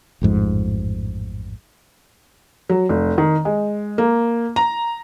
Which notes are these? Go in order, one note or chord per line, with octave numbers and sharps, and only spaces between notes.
A1 F2 G#2
F#3
F1
D#3
G#3
A#3
A#5